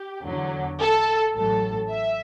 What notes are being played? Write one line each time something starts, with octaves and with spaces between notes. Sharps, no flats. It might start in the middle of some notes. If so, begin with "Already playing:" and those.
Already playing: G4
E2 D3 F#3
A4
A1 A2 F#3 A4
E5